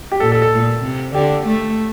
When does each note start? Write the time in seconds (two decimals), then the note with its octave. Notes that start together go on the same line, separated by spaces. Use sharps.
0.12 G4
0.20 A#2 A4
0.32 A4
0.42 A4
0.52 A#2
0.83 C3
1.15 D3 G4
1.46 A3